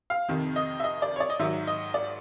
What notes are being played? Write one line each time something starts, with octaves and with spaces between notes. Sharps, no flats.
F5
F2 C3 D#3
D#5
E5
D#5
D5
C#5
D5
D#5
G#2 D#3 F#3 E5
D#5
D5